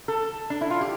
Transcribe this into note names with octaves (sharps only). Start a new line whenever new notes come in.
A4
D4
E4
F4
G4